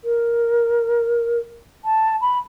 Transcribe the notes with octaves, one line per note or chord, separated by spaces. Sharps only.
A#4
A5
B5